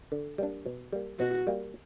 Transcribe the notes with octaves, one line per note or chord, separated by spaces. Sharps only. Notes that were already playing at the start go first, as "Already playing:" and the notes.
D3
G3 A#3 D4
B2
G3 A#3
B2 F#4
G3 A#3